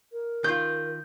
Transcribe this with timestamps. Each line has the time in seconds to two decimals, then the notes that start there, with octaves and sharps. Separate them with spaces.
0.12 A#4
0.44 D#3 F4 G6